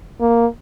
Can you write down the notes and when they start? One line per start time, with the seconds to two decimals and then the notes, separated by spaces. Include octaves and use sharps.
0.21 A#3